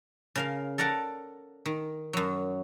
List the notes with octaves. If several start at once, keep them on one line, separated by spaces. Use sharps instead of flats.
C#3 A#4 F5
A4 A#4 D5 F#5 A#5
D#3
F#2 F#3